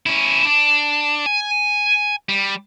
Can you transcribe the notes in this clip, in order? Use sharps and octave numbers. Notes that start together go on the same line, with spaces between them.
C#4 E4
D4
G#5
G3